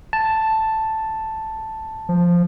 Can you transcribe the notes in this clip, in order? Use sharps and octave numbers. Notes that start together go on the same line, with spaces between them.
A5
F3